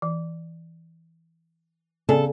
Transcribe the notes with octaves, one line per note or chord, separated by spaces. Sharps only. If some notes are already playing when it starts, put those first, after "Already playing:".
E3
C#3 B3 A4 D5 G#5